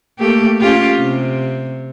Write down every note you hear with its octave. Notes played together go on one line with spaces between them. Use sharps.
A3 A#3 G4
C#4 F4 G4
C3